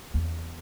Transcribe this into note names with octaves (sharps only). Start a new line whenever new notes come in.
E2